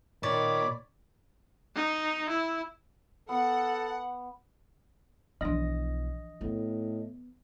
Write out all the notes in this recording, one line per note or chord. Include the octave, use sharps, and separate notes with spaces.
A#2 D#3 C#5 D5 B5 D6
D#4
E4
B3 A4 F#5
B1 E3 F3 D4 E4 D#5 A#6
A2 B3